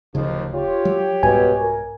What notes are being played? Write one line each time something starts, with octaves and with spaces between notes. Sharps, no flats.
D1 D#2 C#3 F3 D#4
F4 G4 C#5
F#3
C2 G#2 B2 G#5
A#4